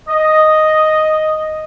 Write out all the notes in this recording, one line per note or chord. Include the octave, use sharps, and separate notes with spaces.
D#5